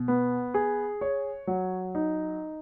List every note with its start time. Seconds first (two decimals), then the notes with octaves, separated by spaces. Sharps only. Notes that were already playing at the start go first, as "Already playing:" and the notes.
Already playing: B2
0.08 B3
0.54 G#4
1.01 C#5
1.47 F#3
1.95 D#4